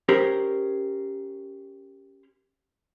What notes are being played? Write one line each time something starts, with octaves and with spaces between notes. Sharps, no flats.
C#4 G4 A#4 C5